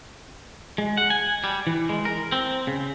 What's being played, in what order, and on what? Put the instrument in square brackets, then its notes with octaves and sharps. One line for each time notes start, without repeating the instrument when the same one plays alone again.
[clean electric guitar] G#3
F#5
G#5
G3
E3
G#3
A#4
C4
C#3